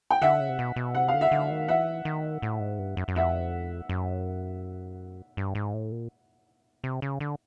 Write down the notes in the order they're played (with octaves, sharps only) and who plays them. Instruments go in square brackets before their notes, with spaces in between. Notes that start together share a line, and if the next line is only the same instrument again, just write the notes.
[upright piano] G5
[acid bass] D3 [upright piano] E5 F#5
[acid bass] C#3
C3
B2
B2
[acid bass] C3 [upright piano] F#5
[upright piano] F5
[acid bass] D3
[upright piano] E5 F#5
[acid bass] D3
D#3
[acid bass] E3 [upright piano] E5 F#5
[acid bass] D#3
A2
G#2
G2
F#2
F#2
[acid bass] F2 [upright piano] E5 F#5
[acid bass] F#2
G2
G#2
A2
A#2
C3
C#3
D3